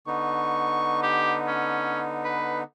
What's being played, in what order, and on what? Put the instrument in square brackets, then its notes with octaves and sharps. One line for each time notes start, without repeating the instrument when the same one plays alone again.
[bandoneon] D3 B3 D#4 [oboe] C#6
[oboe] G4
C#4
B4